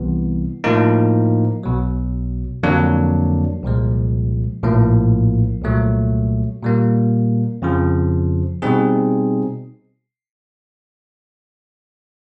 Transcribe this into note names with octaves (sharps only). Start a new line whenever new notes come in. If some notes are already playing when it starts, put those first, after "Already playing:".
Already playing: C2 C3 E3 G3 B3
A2 F3 A#3 D#4
B1 B2 F#3
F2 D3 F#3 A#3 D4
C2 A#2 F3 G#3
A#1 A2 F3 A#3
C2 A#2 F#3 A3
A#2 G3 A#3
F2 C#3 F3
B2 G3 C4 D#4 G#4